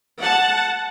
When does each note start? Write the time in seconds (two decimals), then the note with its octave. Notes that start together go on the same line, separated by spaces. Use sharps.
0.20 F#5 A5